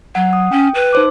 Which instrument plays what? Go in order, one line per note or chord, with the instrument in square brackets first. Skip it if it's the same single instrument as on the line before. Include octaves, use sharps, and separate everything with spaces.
[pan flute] F#3 [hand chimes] F#5
[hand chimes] D#6
[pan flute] C#4 [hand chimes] G5
[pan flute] B4
[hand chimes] D#4 C5 D6